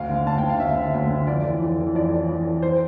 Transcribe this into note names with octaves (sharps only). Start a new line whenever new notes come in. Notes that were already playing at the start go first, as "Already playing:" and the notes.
Already playing: D2 F5
D3
D2 A5
G5
D3
F5
D2 E5
D3
D2
D3
F2 D5
E3
F2
E3
F2 D5
E3
F2
E3
C5